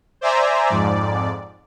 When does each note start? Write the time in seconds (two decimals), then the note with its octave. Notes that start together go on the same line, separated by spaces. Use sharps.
0.21 C5 D5 E5 G#5 A#5
0.69 F2 G#2 D5